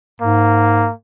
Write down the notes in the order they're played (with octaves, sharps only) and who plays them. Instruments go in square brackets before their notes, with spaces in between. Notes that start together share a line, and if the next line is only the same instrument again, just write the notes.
[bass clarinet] G#2 [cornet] A#3